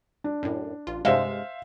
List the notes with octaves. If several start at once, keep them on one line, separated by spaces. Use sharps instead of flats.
D4
F#2 A2
A1 F4
G2 C3 G#3 C5 E5 F5